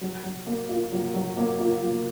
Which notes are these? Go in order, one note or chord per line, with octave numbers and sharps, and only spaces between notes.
F#3
F#3
A#3
F4
F#3
F#3
A#3
F4
F#3